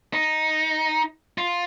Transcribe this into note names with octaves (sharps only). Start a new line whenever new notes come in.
D#4
F4